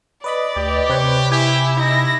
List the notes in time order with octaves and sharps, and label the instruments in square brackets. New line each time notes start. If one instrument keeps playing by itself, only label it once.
[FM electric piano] B4 D#5 B5 [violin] D5
[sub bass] D2 [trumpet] G4
[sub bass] C3 [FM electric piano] C4 B4 C#5
[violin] E4 [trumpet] G4 [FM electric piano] G#5
[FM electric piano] D#4 [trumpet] E4 [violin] A#6